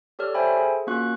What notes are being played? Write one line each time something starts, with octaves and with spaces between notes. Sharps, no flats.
G4 A4 C#5 D5 F6
A4 C5 E5 G5 G#5 B5
G#4
A#3 C#4 F4 F#4 C#6 F#6